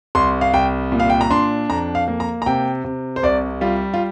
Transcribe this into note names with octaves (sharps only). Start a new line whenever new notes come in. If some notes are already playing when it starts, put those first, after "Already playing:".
C2 C6
F5
C2 G5
A#2
F5
G5
A#5
D4 C6
F2 A#5
F5
A#3
A#5
A#5
C3 G5
C3
C5
C2 D5
G3 F4
F4